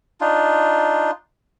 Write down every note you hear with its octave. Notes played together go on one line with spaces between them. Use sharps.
D4 D#4 F4